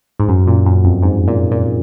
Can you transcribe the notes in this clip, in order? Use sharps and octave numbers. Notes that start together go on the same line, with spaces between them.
G#2
F#2
A#2
F#2
F2
G#2
A#2
A#2